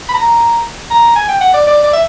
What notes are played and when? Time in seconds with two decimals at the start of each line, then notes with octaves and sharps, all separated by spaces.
0.09 B5
0.14 A#5
0.91 A#5
1.16 G#5
1.29 G5
1.41 F#5
1.54 D5
1.67 D5
1.84 D5
1.93 E5